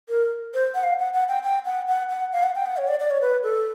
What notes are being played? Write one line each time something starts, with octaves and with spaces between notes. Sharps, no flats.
A#4
C5
F#5
F5
F#5
F#5
G5
G5
F#5
F#5
F#5
F5
F#5
G5
F#5
C#5
D5
D5
C#5
B4
A4